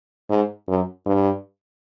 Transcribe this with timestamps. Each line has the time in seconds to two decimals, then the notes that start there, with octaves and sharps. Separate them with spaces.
0.30 G#2
0.68 F#2
1.06 G2